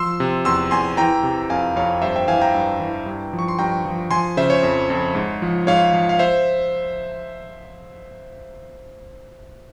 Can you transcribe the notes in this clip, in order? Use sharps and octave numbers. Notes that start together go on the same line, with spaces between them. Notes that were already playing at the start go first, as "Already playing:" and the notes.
Already playing: F3 C6 E6
C3
E2 C6 E6
E2 G#5 C6
E3 G5 A#5
C3
F2 F5 G#5
F2 C#5 F5
G2 C5 E5
E5 G5
E3 F5 G#5
G5 A#5
G2
E3
G2
F3
C#6
C6
G2 G5 A#5
F3
F3 G#5 C6
C#3 C5 E5
C#5
F2
F2
G#2
F3
G#2 C#5 F5
F3
F5
C5 E5